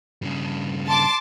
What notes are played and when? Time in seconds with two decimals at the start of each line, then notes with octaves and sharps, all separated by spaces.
0.22 G2 C#3
0.88 A5 C6 D6